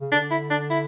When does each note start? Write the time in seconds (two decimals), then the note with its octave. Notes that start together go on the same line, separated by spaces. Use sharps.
0.01 C#3
0.11 D3 D4
0.31 E4
0.51 D4
0.70 E4